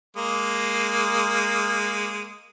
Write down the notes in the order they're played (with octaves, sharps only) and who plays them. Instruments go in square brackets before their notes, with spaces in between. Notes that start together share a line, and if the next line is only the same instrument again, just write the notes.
[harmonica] G#3 A#3